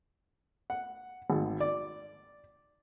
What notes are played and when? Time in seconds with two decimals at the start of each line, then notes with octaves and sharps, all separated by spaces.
0.70 F#5
1.30 G#1
1.61 D5